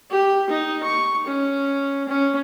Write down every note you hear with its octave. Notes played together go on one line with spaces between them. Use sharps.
G4
D#4
C#6
C#4
C#4